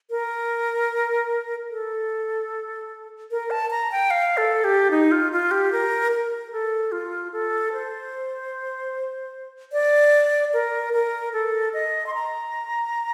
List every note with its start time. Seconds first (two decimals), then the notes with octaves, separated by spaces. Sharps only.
0.10 A#4
1.70 A4
3.31 A#4
3.51 A5
3.71 A#5
3.92 G5
4.11 F5
4.37 A4
4.64 G4
4.91 D#4
5.12 F4
5.32 F4
5.51 G4
5.72 A#4
6.12 A#4
6.52 A4
6.92 F4
7.33 A4
7.73 C5
9.72 D5
10.53 A#4
10.93 A#4
11.33 A4
11.73 D#5
12.07 C6
12.14 A#5